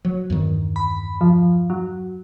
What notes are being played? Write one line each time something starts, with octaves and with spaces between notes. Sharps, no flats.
F#3
E2 G2 D#3
B5
F3
F#3